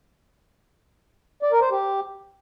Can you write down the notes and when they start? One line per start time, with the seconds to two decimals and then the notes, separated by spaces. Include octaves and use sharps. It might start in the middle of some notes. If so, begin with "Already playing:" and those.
1.42 D5
1.52 A#4
1.62 C5
1.71 G4